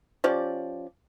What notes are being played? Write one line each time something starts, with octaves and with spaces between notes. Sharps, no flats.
F3 C#4 G4 D5